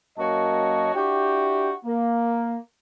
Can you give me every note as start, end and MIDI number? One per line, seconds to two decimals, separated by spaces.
0.19 0.92 42
0.19 0.92 58
0.19 0.92 66
0.19 0.92 73
0.19 0.92 75
0.19 0.92 81
0.96 1.73 62
0.96 1.73 64
0.96 1.73 66
0.96 1.73 67
1.86 2.57 58